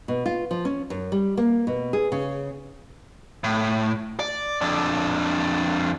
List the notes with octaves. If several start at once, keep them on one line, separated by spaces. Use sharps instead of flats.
B2
F4
F3
C#4
F#2
G3
A#3
B2
G#4
C#3
A2
D5
F2 D4